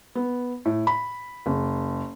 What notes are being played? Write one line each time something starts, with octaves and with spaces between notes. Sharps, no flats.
B3
A2
B5
F#1